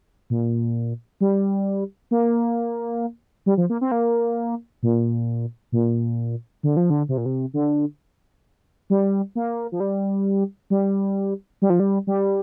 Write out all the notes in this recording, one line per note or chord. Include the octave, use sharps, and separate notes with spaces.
A#2
G3
A#3
G3
F3
A#3
C4
A#3
A#2
A#2
D3
F3
D3
C3
A#2
C3
D3
G3
A#3
F3
G3
G3
G3
F3
G3
G3